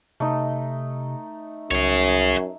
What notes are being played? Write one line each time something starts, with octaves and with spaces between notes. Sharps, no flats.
C3 A3 D#4
C2 F#2 G#4 C#5